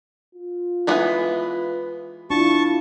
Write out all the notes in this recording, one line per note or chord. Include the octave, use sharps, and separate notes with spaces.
F4
E3 G#3 B3
D4 E4 F4 A5 C#6